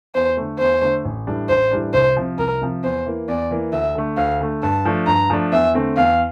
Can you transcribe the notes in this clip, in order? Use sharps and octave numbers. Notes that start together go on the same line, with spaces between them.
E2 C5
D3 A3
E2 C5
D3 A3
A1
A2 E3 G3 D4
A1 C5
A2 E3 G3 D4
C2 C5
C3 F3
C2 A#4
C3 F3
E2 C5
E3 A#3
E2 D5
E3 A#3
D2 E5
D3 A3
D2 F5
D3 A3
G2 A5
F3 A3 D4
G2 A#5
F3 A3 D4
E2 E5
D3 A3 C4
E2 F5